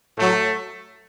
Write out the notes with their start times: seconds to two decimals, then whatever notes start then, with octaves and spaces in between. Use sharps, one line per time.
0.18 A2 F#3 A3